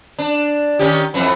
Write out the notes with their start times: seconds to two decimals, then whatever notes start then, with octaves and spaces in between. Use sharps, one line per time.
0.18 D4
0.79 D#3 C#4 G4
1.14 F2 E3 F#3